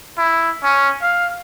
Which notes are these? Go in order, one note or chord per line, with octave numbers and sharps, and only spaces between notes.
E4
C#4
F5